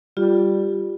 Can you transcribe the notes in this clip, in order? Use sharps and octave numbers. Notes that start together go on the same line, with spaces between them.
G3 F4 G4